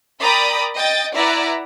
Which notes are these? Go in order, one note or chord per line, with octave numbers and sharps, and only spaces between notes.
A#4 D5 G5 A#5 B5 D#6
D#5 G5 A6
E4 B4 D5 E5 F#5 A#5